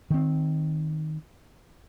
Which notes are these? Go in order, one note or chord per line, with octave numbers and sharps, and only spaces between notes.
D#3 C4